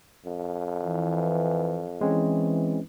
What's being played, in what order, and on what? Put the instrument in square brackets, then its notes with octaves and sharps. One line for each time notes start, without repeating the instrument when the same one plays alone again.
[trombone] F2
[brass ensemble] E3
[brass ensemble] E3 [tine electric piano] G#3 C4 C#4